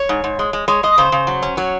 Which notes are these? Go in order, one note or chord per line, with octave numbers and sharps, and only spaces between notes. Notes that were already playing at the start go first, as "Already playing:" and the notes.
Already playing: C#5
G#2
G#2
G#3
G#3
G#3 C#5
G#3 D#5
C#3 C5
C#3
F#3
C#4
F#3 C#5